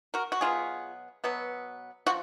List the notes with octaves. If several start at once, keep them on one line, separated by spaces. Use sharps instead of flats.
F#4 A#4
F#4
B2 F#3 B3 F4 G#4
B2 F#3 B3
F3 F#4